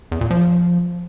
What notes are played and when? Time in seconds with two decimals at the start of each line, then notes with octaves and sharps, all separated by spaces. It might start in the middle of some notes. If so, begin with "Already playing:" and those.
0.12 E2
0.21 A#2
0.31 F3